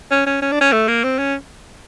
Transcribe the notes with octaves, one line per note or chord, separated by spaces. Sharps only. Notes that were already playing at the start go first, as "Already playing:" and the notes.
C#4
C#4
C#4
D4
C#4
A3
A#3
C4
C#4